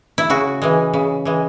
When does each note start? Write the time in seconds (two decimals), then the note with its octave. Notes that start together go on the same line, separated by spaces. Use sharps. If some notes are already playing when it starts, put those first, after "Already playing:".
0.18 E4
0.30 C#3 F#4
0.62 E3 G#3
0.93 C#3
1.25 E3 G#3